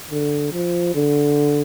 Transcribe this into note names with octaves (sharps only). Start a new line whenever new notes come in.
D3
F3
D3